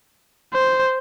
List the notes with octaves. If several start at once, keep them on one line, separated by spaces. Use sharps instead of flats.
C5